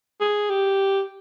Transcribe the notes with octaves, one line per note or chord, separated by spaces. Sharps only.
G#4
G4